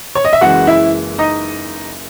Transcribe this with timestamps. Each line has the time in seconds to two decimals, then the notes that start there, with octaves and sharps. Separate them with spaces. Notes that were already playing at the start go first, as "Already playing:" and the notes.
0.15 C#5
0.25 D#5
0.33 E5
0.41 F#1 F#2 E3 G#3 F#4 F#5
0.67 E4 E5
1.18 D#4 D#5